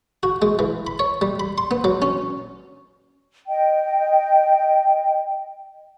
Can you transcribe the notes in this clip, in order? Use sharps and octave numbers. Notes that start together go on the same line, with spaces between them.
F#4
G#3
E3
B5
C#5
G3
B5
C6
B3
F#3
C#4
D#5 G5